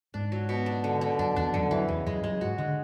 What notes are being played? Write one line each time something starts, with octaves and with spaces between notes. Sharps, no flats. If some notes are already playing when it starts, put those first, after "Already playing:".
G#2 D4
F#3
B2
D4
D3
D3
F#2 D4
E2 D4
F#2 D3
F#2 E3
E2 C#3
F#2 G#3
F#2 G#3
G#2 F#4
D3 G#3